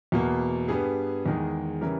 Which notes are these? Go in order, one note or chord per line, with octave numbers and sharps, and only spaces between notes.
E2 B2 A#3
G2 G3 B3 G#4
E2 D#3 G#3
C#3 E3 G3 A#4